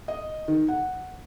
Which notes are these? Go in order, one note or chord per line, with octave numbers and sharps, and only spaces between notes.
D#5
D#3
F#5